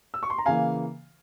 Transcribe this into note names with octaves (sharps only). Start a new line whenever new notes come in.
E6
C#6
C6
A#5
C#3 E3 A#3 F5 G#5